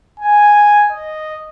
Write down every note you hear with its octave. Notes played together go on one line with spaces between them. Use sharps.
G#5
D#5